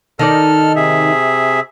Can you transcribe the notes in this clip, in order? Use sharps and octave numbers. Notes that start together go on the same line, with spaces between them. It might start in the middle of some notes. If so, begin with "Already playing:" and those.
D#3 D#4 A4 D5 F6
C3 G#4 E5